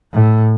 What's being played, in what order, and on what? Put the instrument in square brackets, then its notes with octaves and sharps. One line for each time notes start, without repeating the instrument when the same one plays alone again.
[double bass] A2